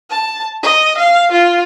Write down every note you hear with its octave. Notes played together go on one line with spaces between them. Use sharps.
A5
D#5
F5
F4